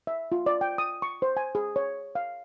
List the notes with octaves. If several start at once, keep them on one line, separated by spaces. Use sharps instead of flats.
E5
F4
D5
G5
D#6
C#6
C5
G#5
G#4
C#5
F5